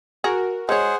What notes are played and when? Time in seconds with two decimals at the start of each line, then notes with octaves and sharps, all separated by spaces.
0.24 F#4 G#4 A#4
0.69 G#3 G#4 C5 C#5 F#5